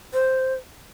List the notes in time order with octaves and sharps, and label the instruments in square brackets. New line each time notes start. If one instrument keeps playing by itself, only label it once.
[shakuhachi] C5